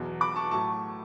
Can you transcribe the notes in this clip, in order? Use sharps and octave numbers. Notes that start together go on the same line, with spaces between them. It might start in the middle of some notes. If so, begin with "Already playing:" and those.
Already playing: E2 B2 F#3
B5 D6
A5 C#6
A2 F#3 A3 A5 C#6